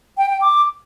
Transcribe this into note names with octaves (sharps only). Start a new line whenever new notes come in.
G5
G5
D6